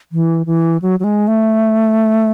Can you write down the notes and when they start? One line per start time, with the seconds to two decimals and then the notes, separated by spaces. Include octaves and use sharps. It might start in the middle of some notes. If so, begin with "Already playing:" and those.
0.12 E3
0.46 E3
0.82 F#3
1.00 F#3
1.04 G#3
1.28 A3